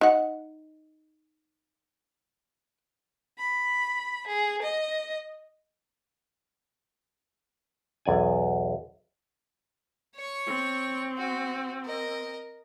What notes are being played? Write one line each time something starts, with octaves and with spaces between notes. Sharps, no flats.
D#4 F#5
B5
G#4
D#5
B1 E2 D5 G#5
C#5 C#6
C4
F#4
A#4 D#5